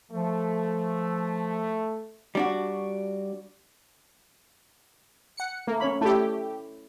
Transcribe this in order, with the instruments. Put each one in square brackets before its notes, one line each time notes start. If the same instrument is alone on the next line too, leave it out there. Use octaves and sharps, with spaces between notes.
[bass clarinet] F3 [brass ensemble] A3
[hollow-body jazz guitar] G3 D4 F#4
[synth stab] F#5 C#7
[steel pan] A3 [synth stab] A#3
[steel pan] C#4 C#5 B5
[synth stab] A3 G4 [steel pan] E4 A4 D5